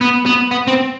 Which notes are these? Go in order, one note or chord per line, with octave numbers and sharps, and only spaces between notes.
B3
B3
B3
C4